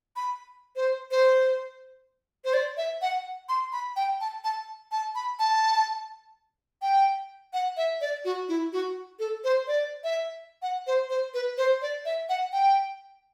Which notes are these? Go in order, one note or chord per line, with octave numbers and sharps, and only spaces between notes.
B5
C5
C5
C5
D5
E5
F#5
C6
B5
G5
A5
A5
A5
B5
A5
G5
F#5
E5
D5
F#4
E4
F#4
A4
C5
D5
E5
F#5
C5
C5
B4
C5
D5
E5
F#5
G5